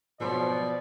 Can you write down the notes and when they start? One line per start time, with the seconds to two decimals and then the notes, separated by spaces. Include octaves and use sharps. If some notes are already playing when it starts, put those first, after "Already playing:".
0.20 B2 F3 F#3 C5 D5